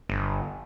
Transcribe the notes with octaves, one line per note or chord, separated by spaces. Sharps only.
G1